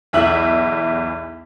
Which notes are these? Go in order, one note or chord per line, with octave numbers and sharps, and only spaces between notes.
B1 E2 E5 E6 F#7